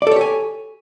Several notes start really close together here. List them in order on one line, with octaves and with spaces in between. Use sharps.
D5 A4 C#5 G4 G#5